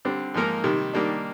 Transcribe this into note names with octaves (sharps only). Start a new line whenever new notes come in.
D3 G3 C4
G#2 F3 A#3 D#4 A#4
C3 D#3 G3
D#3 G3 A#3 D4